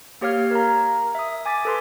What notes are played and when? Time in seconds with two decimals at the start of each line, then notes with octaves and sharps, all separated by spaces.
0.21 A#3 G4 C#5 F5 F6 G#6
0.51 A#4 A#5
1.15 E5 D#6
1.46 G#5 D6 A6 B6
1.65 A4 B4 C6